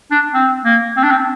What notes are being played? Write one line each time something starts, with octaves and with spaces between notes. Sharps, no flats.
D4
C4
A#3
C4
D4
C4